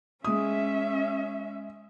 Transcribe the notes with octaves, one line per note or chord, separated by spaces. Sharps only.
G#3 C#4 E5 D#6